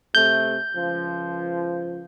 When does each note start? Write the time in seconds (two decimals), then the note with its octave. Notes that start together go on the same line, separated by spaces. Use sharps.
0.15 C3 A3 G6
0.75 C#2 F3